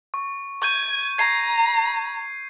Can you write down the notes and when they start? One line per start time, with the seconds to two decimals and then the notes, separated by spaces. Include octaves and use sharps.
0.14 C#6
0.62 C#6 G6 G#6 D#7
1.18 A#5 G#6 C7